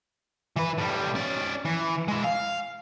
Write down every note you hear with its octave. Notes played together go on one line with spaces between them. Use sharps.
E3 B4
A2 G3
C#4 D5
E3
G#3 E4
F5